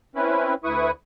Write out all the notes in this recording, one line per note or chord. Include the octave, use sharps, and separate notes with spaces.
C4 C#4 E4 B4
D2 E4 B4 C#6 D#6